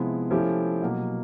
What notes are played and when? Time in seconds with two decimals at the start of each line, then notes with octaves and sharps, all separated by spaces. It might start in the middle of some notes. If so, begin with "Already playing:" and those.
Already playing: C3 F3 G#3 B3 E4
0.30 F3 A3 C#4 E4 G4
0.82 B2 F#3 A#3